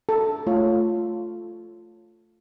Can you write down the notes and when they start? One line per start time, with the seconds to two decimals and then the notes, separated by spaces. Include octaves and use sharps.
0.09 A4
0.47 A3 F4 C#5